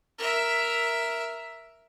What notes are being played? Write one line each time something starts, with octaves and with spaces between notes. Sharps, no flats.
A#4 E5